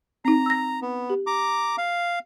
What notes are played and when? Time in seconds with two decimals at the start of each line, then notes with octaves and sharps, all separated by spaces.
0.25 C4 D#4 A#5
0.46 E6 A#6
0.82 B3
1.10 G4
1.27 A#5 D6
1.78 F5